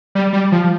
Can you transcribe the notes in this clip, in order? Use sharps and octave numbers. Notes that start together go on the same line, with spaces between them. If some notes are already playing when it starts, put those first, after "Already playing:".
G3
G3
F3